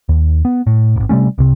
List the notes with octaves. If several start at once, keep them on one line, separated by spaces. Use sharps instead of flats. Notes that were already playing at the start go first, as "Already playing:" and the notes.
D#2
B3
A2
D1 G#1
C3 G3 A3 C#4
C2 C3